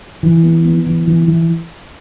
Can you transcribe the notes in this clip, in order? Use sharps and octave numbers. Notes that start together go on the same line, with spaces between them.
E3
B3
B3
E3
E3
E3